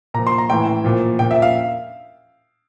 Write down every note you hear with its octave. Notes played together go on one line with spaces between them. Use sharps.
A#2 F3 A#5
C6
A#5
A2 E3 G5
A#2 F3
A#2 F3 G5
E5
F5